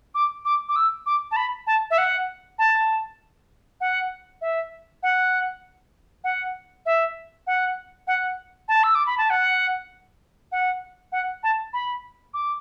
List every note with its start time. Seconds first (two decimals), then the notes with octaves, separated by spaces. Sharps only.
0.15 D6
0.45 D6
0.69 D6
0.76 E6
1.06 D6
1.31 A5
1.36 B5
1.67 A5
1.91 E5
1.98 F#5
2.59 A5
3.81 F#5
4.41 E5
5.03 F#5
6.24 F#5
6.86 E5
7.47 F#5
8.07 F#5
8.68 A5
8.84 E6
8.95 D6
9.06 B5
9.18 A5
9.30 F#5
10.52 F#5
11.12 F#5
11.43 A5
11.73 B5
12.34 D6